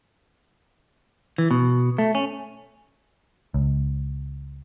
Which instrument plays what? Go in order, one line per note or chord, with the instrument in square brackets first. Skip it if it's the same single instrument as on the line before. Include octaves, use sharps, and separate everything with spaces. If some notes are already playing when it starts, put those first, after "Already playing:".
[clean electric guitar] E3
B2
A3
C#4
[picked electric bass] C#2